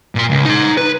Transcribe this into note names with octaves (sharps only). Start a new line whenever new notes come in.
A#2 C6
C#2
D#4 C6
B4